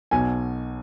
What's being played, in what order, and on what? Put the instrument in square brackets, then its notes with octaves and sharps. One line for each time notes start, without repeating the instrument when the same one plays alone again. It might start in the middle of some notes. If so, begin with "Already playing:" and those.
[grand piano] B1 B2 G#5